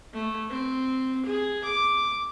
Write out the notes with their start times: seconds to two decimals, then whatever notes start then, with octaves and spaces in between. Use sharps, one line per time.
0.13 A3
0.50 C4
1.25 G#4
1.64 D6